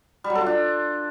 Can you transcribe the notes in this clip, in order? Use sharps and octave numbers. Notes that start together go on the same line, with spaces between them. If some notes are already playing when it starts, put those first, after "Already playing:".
G3
F#3
A4
F4
D4